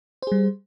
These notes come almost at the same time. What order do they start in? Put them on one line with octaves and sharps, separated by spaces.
C5 G#4 G3